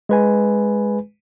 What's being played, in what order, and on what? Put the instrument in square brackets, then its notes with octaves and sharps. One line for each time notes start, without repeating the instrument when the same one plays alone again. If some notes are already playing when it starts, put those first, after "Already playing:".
[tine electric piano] G#3 B4 G#5